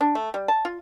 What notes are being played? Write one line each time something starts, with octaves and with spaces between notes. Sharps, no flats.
D4
A3
G3
A5
F4